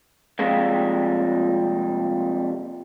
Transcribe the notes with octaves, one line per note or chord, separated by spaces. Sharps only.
F2 C3 G3 G#3 A#3